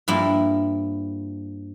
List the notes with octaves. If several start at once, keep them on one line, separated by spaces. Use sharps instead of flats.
G2 F3 A#3 E4